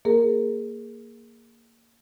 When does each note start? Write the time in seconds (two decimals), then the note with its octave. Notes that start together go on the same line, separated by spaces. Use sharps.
0.05 A#3 G#4 A#4